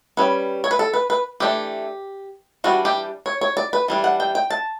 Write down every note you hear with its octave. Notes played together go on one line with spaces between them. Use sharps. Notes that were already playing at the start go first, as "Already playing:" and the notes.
G3 C#4 B4
C#5
B4
A4
B4
B4
E3 A3 D4 G4
E3 G3 D4 F#4
G4
C#5
C#5
D5
B4
E3 G3 D4
F#5
G5
G5
A5